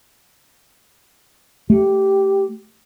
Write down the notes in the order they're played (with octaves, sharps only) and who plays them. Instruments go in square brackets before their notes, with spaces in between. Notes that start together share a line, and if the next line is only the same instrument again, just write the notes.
[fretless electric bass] A3 [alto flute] G4